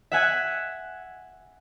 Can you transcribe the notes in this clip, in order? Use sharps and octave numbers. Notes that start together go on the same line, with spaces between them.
E5 F#5 G#5